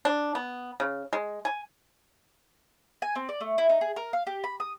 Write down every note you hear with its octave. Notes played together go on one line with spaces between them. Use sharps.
D4
B3
C#3
G#3
G#5
G#5
C4
D5
A3
E4
D#4
G#4
A#4
F5
G4
B5
D#6